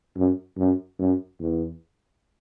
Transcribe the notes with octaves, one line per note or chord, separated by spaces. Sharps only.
F#2
F#2
F#2
E2